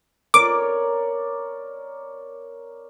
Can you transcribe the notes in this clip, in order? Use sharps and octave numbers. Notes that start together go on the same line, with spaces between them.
A#4 C#5 D5 D6